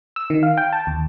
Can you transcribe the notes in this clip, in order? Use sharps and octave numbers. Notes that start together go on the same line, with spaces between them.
E6
D#3
F5
G5
A5
D#2